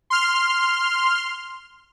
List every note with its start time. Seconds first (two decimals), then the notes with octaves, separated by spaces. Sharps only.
0.10 C6 F6